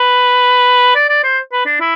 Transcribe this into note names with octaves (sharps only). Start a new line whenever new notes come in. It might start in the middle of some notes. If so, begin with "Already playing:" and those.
Already playing: B4
D5
D5
C5
B4
D4
E4